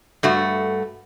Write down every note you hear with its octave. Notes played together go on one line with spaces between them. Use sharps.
G2 A3 F#4